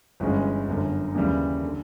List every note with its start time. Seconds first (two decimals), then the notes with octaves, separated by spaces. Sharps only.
0.20 G1 G2 E3 G#3 C#4
0.68 G1 F#2 D3
1.14 D#2 C#3 E3 G3
1.63 D3